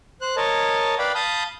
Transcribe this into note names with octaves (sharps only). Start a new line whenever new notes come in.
C5 F#6
A#4 C#5 D#5 A5
B4 D5 F5 G5 B5
F5 A5 B5 D#6 G6